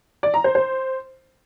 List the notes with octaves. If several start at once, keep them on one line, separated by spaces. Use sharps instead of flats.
D5
A#5
C5
C5